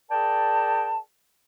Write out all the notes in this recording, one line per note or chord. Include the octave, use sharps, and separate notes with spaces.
G#4 A#4 D5 G5 A5